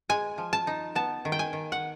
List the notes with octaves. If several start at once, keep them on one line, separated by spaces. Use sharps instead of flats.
G#3 G#5
F3
A5
D#4
B3 A5
D#3
G5
G#5
D#3
F#5